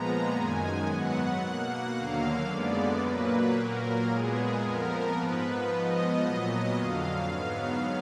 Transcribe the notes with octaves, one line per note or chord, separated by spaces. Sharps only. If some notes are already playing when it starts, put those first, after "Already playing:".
Already playing: A#2 F3 G#3 B3 A#5
F#2 D#3 G#3 G#5
G#2 F#3 B3 F#5
B2 A#3
D#2 D3 F#3 A#3 F5
F#2 D3 G#3 B3 D5
A#2 F#3 A#3 B4
A#2 F#3 A#3 A#4
A#2 G#3 B3 G#4
F2 F3 B3 A#4
G#2 F3 B3 B4
G#2 F3 B3 D#5
A#2 F#3 B3
F2 D3 F#3 F5
G#2 F#3 B3 F5